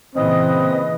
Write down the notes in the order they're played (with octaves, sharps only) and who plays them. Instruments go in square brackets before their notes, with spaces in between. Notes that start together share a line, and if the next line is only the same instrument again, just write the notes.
[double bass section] A#2 C#3 E3 [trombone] C4 [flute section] B4 D#5 D#6